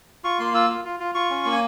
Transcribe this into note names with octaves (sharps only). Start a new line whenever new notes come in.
F4 C#6
A#3 C6
F4 E6
F4
F4
F4
F4 C#6
C#4
A#3
G#5